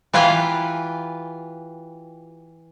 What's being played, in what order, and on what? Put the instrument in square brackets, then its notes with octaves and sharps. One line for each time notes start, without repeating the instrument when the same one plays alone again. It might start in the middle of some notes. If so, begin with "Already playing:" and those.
[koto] E3 F4 G4 B4 G#5 A#5